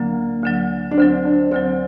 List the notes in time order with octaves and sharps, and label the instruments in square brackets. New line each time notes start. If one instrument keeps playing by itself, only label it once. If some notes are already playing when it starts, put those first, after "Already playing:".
Already playing: [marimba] D2 D3 F#3 [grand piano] A#3
[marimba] D2 D3 F#3
[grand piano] D4
[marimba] D2 D3 F#3 [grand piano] C4
[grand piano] D4
[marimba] D2 D3 F#3 [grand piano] C4